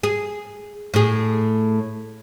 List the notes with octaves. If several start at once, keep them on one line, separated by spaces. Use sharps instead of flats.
G#4
A2 G#4